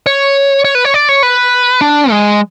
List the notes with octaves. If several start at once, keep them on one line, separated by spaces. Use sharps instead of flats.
C#5
C#5
B4
C#5
D5
C#5
B4
D4
G#3